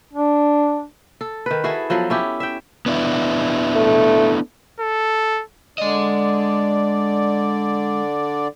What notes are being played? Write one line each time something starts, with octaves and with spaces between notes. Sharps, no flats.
D4
A4
D#3 B4
E4 F#4 G#4 A4
F3 F#3 B3 A4
C#4 E4 G4
E5 G5
B3 D4 E4
A3
A4
D3 G#3 D5 D#5